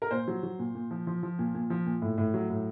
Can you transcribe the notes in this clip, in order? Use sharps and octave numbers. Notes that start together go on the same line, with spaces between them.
A#4
A#2 C5
F#3
F#3
A#2
A#2
F3
F3
F3
A#2
A#2
F3
A#2
A2
A2
F#3
A2